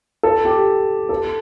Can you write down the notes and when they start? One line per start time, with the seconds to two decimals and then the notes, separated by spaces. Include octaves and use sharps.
0.23 A4
0.45 G4
1.09 A4